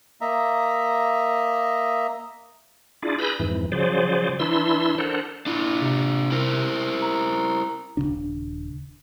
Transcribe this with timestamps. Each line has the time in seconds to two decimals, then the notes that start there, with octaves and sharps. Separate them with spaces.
0.21 A#3 D#5 E5 A#5
3.03 D4 E4 F4 G#4 D5
3.19 G#4 B4 B5 E6 G6 A#6
3.39 F2 G#2 E3
3.72 C#3 F3 F#3 G#4 C5 D5
4.40 E3 D4 E4 C6 E6
4.98 D4 A4 A#4 C5 F#5
5.46 D4 E4 F4
5.82 C3
6.31 E4 A#4 C5
7.02 A#5
7.97 D#1 D#2 C#3 D4